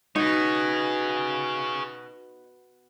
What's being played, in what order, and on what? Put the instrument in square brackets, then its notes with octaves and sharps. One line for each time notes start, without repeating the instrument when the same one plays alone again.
[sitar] B2 [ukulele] D#4 [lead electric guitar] G#4 C#5